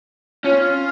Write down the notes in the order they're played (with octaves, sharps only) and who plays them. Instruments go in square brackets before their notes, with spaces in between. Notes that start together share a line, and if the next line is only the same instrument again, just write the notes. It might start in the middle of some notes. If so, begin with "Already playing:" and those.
[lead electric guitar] C#4 [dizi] F4